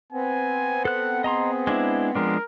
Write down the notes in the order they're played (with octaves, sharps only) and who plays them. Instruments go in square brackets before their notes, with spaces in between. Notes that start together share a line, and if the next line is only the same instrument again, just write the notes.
[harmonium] B3 C4 [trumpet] G#5
[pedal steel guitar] A4 F#6 [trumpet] F#5
[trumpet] G#4 [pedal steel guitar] D#5 A#5 C6
[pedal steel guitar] G#3 D4 E4
[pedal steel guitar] F3 G#3 D4 [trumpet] A#4